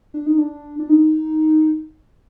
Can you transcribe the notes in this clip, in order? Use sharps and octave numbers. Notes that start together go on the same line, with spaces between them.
D4
D#4
D4
D4
D#4